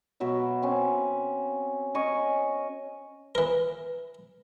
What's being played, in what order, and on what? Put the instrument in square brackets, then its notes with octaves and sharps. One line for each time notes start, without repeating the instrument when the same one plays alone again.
[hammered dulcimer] B2 F#3 E5
C4 C#4
C#4 D#5 G#5 C#6
[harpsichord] E3 A#4